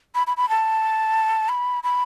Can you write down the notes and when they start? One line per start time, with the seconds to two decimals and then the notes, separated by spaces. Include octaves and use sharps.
0.15 B5
0.27 B5
0.37 B5
0.49 A5
1.49 B5
1.84 B5